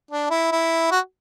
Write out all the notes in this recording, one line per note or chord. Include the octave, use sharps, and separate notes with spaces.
D4
E4
E4
F#4